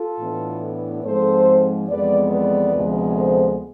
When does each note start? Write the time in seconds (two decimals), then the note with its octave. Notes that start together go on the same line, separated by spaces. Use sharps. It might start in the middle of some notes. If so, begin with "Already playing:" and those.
Already playing: F4 A4
0.19 A2 E3 B3 D4
1.04 G#2 F3 G#3 C4 A4 C5
1.89 F2 E3 G#3 B3 B4 D5
2.31 B4 D5
2.74 D2 C3 F3 G#3 B3
3.15 A4 C5